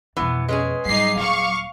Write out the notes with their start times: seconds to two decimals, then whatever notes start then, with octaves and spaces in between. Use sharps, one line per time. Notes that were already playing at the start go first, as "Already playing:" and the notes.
0.17 F2 B2 E3 B3
0.49 G#3 C#4 G#4 B4
0.85 G#2 F#3 G3 D#4 D6 C7
1.16 D#1 F5 C#6